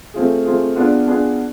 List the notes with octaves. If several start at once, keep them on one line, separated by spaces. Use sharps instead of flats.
A3 C4 F4 G#4
A3 C4 F4 G#4
B3 D4 F4 G#4
B3 D4 F4 G#4